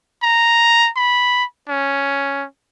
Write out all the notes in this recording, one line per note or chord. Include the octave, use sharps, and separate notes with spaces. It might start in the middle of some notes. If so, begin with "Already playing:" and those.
A#5
B5
C#4